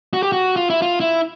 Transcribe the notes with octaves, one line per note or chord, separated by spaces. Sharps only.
F#4
G4
F#4
F4
E4
F4
E4